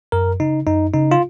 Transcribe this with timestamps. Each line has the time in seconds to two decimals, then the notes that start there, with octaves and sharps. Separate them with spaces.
0.12 F#2 A#4
0.40 C#3 D#4
0.67 F#2 D#4
0.94 C#3 D#4
1.11 F4